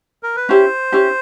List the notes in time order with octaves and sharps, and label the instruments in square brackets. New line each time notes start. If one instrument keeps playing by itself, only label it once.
[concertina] A#4
B4
[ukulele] C#4 E4 G4 [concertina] C5
[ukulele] C#4 E4 G4